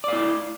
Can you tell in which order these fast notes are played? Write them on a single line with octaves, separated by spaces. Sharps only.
D5 F5 E4